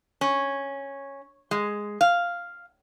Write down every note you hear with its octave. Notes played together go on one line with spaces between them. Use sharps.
C#4
G#3
F5